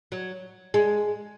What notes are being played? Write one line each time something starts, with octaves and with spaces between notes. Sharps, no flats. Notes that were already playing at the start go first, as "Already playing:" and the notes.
F#3
G#3